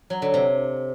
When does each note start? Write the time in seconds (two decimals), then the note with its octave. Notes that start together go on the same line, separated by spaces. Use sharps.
0.10 F#3
0.22 D3
0.34 C3